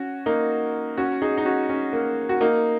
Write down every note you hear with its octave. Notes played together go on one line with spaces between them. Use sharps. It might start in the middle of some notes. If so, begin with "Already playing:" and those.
Already playing: C#4 F#4
A#3 D#4
C#4 F#4
D#4 G#4
D#4
C#4 F#4
C#4
A#3
F#4
A#3 D#4